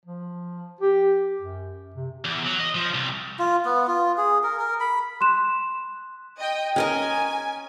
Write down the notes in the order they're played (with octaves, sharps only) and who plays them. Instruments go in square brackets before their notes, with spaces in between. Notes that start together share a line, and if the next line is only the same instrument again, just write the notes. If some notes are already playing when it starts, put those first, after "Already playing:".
[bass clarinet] F3
G4
F#2
C3
[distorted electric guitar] E2
F#3
D#5
F3
C2
[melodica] F4
B3
F4
G#4
A#4
A#4
B5
[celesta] C6 F#6 E7
[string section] D#5 G5
[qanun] C#4 A#4 D#5 [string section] G#5